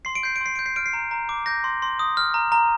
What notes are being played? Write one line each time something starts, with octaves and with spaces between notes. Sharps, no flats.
C6 C7
D7
G6 C7
D7
C6 C7
G6 D7
C7
F6 D7
C7
A#5
A#5
D6
G6 A#6
C6
C6
D#6
F6
A#5
A#5